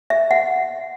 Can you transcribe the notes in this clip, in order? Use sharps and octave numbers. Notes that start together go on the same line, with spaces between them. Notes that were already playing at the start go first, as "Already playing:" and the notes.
E5
F#5